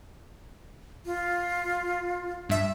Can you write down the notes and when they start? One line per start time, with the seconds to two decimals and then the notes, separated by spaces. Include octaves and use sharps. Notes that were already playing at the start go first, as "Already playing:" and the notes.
1.06 F4
2.49 G2 E5